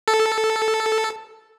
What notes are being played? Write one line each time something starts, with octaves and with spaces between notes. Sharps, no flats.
A4